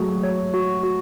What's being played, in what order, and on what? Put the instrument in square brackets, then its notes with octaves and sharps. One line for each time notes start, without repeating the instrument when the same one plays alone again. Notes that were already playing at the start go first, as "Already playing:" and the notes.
Already playing: [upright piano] F#3 A3 [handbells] F#4 G#4
[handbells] C#5
F#4
F#4